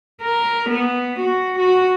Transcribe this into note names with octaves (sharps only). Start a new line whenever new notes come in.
A#4
B3
F#4
F#4